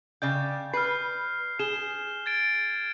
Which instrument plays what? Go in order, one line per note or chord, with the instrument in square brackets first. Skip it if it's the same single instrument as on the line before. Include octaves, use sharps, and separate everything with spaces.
[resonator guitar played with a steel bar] C#3 D5 G5 [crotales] G6
[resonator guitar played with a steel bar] B4 [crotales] F6 C7
[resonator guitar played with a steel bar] G#4 [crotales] E7 G7
[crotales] G#6 A6 D7